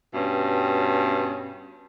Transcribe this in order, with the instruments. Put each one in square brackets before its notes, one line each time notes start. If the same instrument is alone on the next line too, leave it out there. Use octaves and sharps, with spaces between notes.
[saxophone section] G2 B2 C#4